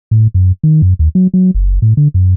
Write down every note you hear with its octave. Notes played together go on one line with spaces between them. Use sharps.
A2
F#2
D#3
F#2
D#2
F#3
F#3
F#1
A2
D3
F#2